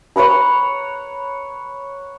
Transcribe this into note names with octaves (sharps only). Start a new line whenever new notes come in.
C#5 F#5 A#5 B5